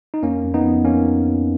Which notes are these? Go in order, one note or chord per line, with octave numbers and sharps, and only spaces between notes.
D#4
F2 A#3 C#4
F2
B3 D#4
F2
F2 A#3 C#4